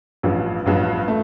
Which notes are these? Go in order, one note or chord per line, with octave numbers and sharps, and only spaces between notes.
A1 G2 F3
A1 G2 F3
A3